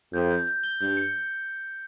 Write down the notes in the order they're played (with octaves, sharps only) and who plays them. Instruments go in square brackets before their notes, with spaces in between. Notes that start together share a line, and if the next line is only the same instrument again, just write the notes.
[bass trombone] F2 [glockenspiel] G6
[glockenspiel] G6
G6
G7
[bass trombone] G2 [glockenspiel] G6
[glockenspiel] C#7